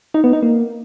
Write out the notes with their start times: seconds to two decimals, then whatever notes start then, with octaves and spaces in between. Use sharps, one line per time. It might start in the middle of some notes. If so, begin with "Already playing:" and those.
0.14 D#4
0.24 B3
0.33 D#4
0.43 A#3